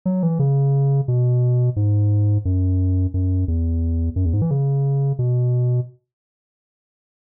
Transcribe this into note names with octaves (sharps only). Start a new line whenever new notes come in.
F#3
E3
C#3
B2
G#2
F#2
F#2
E2
F#2
E2
G#2
E3
C#3
B2